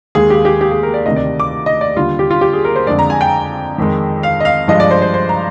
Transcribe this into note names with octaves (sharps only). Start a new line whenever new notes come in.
D#2 D#3 G#3 G#4
G4
G4
G4
G#4
A#4
D5
D2 C3 D#3 D#5
D5
D6
D#5
D5
D#2 D3 G3 F4
G4
F4
G4
G#4
A#4
C5
F2 D3 G#3 D5
A#5
G#5
G5
F2 D#3 G#3
F5
D#5
F5
G2 F3 G#3 D#5
D5
C5
C5
C5
A#5